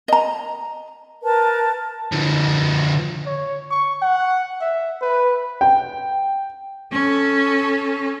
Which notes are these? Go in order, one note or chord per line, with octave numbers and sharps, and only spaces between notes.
D#5 A#5
A#4 B4 A5
D3 F3
C#5
C#6
F#5
E5
B4
G5
C#4 A4